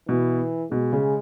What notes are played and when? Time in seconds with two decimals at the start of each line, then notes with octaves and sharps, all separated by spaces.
0.08 B2 E3
0.71 B2 G#3
0.93 C#3